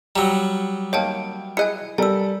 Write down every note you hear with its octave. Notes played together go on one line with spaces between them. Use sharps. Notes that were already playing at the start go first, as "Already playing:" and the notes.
F#3 G3 A#5 E6
D#3 A#3 C#5 G5 A5 D7
E4 G#4 D#5 G#5 F#6 C#7
G3 A4 A#4 G#5 E6